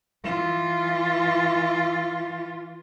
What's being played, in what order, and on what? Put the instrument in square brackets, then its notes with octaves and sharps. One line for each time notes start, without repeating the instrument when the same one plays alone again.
[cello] E3 F4